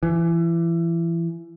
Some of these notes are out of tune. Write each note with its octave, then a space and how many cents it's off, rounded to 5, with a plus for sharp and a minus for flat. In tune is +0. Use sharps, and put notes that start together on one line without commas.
E3 +25